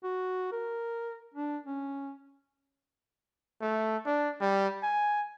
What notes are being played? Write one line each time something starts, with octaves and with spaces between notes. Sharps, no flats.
F#4
A#4
D4
C#4
A3
D4
G3
G#5